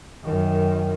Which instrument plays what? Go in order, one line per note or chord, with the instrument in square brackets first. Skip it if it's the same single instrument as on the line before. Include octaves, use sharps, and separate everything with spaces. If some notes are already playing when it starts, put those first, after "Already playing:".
[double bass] F#2 D#3